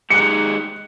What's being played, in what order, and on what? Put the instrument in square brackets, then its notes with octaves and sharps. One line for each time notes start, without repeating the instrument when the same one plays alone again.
[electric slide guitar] G#3 D#4 G4 [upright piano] F#6 C#7